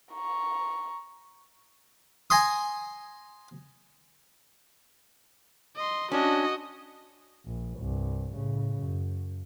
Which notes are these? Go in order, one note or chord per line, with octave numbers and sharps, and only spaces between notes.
A#5 C#6
G#5 A#5 C6 D#6
D#5 C6
C#4 D4 F#4 D#5
A#1
C2 G2
A2 C#3
F#2